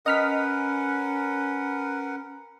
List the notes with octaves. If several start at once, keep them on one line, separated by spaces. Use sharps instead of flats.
C#4 A#4 B4 D#5 F#5 F6 B6